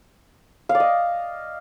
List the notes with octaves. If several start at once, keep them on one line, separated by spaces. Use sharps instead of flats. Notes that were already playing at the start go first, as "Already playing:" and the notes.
F5
D5
D#5